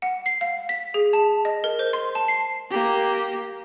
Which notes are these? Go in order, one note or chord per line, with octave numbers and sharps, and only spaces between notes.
F#5
C7
F5
B6
G#4
A5
D#5
A#4
C5
C6
A5
C7
A#3 G4